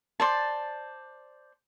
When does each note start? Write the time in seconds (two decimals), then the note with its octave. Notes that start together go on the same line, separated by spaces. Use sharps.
0.20 C5 D5 A5